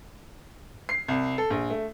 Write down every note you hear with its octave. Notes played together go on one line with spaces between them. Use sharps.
C7
C2
A4
A#1
A3